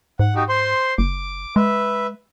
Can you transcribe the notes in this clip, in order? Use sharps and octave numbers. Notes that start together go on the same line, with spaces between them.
G#2 F#5
D#4 F#4 G4
C5 C6
F#1 D6
G#3 B4 E5